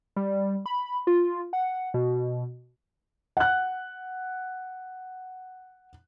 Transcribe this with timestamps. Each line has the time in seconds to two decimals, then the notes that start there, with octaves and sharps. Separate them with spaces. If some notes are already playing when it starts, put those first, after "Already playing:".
0.16 G3
0.66 B5
1.07 F4
1.53 F#5
1.94 B2
3.37 F#5 F#6